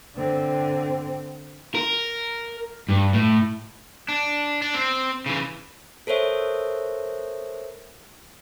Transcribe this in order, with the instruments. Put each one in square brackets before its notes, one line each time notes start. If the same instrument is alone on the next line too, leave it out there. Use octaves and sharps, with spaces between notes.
[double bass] D3 C4
[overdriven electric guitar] A#4
G2
A2
D4
D4
C4
C#3 E3
[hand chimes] A4 A#4 C5 C#5 E5